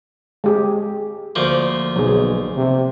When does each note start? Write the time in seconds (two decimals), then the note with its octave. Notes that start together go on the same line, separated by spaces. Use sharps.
0.44 G#3 G4 G#4
1.35 D2 F3 A#3
1.96 B1 F#3 G#4
2.56 C3